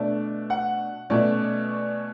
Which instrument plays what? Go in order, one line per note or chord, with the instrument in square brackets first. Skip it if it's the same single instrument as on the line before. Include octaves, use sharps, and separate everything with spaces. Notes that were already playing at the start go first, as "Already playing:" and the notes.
Already playing: [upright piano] B2 A3 D4 D5
F#5
B2 A3 C#4 D5